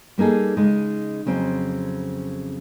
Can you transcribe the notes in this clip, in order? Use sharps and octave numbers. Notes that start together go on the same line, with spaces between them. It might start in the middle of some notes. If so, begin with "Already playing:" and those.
G3 A#3 D#4 G#4 A4
C#3 G#3 D#4
F2 C#3 F#3 C4